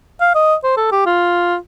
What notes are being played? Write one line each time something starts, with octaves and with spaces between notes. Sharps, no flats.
F5
D#5
C5
A4
G4
F4